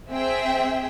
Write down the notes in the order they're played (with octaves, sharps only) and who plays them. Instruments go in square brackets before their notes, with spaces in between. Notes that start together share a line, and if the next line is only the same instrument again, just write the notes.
[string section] C4 G#4 E5 G5